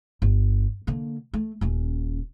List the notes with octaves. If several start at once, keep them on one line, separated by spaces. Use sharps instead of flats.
G1
D3 A#3
A3
D#1 C#4